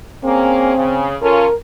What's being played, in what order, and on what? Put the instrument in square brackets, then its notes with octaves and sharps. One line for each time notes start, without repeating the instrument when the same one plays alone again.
[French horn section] A#3 C#4 G#4 [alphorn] C4
[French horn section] C#3
[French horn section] C#4 F4 A4 [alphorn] A#4